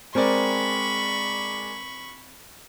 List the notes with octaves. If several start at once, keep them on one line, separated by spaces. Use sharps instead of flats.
G#3 C4 A#4 D5 B5 C#6